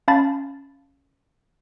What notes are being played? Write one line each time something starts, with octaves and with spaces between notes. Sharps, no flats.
C#4 F5 A5 B5 A6